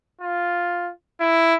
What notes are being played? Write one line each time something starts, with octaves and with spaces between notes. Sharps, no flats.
F4
E4